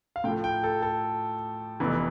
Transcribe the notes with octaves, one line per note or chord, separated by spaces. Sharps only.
F5
A2 F3 A3 G5
G5
A4
A4
F1 F2 E3 B3